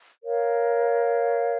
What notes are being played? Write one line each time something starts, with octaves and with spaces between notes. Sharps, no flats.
A#4 C#5 F5